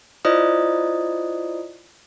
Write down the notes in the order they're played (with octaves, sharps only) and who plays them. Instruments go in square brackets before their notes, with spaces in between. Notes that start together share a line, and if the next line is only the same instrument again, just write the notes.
[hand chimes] E4 F4 C5 D5 D#5 D#6